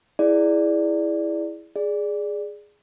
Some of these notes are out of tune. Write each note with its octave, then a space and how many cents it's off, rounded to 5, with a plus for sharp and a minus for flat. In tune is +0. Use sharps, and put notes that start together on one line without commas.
E4 +0 G#4 +0 D5 +0
G#4 +0 D5 +0